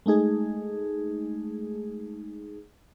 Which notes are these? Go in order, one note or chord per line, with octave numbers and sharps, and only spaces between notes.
G#3 A3 D#4 G#4